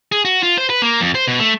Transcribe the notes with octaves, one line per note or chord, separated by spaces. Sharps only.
G#4
F#4
F4
C5
B4
A#3
F2
C5
B2
A3